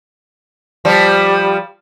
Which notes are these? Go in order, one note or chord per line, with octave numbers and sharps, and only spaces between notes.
F3 G3